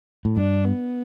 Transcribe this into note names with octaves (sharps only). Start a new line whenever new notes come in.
A2
G2 D4
B3